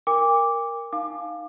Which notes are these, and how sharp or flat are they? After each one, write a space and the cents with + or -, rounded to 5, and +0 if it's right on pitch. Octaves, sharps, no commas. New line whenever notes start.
A#4 +0 G5 +45 D6 -10
D#4 +0 F5 +5 D6 +30